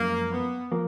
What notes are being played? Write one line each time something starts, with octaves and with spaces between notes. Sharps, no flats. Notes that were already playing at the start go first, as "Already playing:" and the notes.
Already playing: F#2 F3 G#3 A#3
B3
F3 A#3